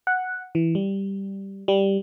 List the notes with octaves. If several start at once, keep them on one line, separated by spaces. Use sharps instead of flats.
F#5
E3
G3
G3